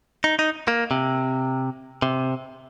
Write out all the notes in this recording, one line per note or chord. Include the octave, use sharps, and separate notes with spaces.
D#4
D#4
A#3
C3
C3